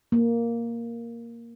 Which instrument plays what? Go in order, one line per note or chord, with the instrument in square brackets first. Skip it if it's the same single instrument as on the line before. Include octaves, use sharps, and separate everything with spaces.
[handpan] A#3